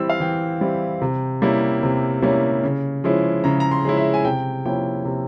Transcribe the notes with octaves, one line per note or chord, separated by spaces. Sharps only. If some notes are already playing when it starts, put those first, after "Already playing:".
Already playing: E3 G3 C4 E4 E6
F5
E3 G5
G3 C4 E4
C3
G3 A#3 C#4 E4
C3
G3 A#3 C#4 E4
C#3
F3 G#3 C#4 E4
C#3 A#5
A#5
C6
F3 G#3 C#4 E4
E5
G#5
C3 G5
F3 A#3 C#4 E4 G5
C3